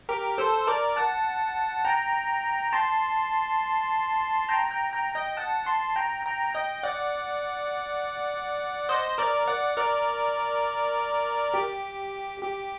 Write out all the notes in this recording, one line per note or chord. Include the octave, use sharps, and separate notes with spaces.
G4 A#4
A4 C5
A#4 D5
F#5 A5
G5 A#5
A5 C6
G5 A#5
G5 A#5
G5 A#5
D#5 G5
F#5 A5
A5 C6
G5 A#5
G5 A#5
D#5 G5
D5 F#5
C5 D#5
A#4 D5
D5 F#5
A#4 D5
G4
G4